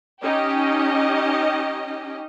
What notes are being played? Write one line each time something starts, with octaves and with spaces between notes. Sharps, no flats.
C#4 D#4 G4 D#5